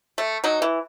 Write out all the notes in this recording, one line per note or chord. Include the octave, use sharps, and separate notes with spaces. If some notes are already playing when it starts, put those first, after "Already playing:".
A3
F#3 D#4
E3